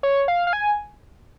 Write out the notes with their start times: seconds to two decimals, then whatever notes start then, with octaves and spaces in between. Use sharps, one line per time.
0.03 C#5
0.28 F5
0.47 F5
0.53 G#5